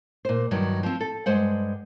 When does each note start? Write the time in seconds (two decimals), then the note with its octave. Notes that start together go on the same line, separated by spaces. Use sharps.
0.25 A#2 C5
0.51 G2 D#3 F#3
0.83 F3 C4
1.00 A4
1.26 G2 G#3 C5 F#5